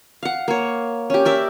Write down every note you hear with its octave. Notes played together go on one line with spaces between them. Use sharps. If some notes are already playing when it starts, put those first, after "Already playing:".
F5 F#5
A#3 C#5
C#4 G4
A#4 D5 E5